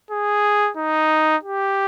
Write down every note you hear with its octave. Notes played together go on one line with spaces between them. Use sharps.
G#4
D#4
G4